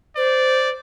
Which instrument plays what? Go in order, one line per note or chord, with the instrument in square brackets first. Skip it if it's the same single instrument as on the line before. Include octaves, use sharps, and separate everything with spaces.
[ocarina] C5 [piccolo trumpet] D5